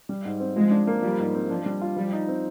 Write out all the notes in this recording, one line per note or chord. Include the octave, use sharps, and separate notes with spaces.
G3
G#2
C4
F3 G#3
D4
A#3
F3 G3
G#2
C4
F3 D4
G3
F4
F3 G3
D#4
C4